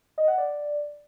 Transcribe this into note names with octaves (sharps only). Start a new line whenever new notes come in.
D#5
F#5
D5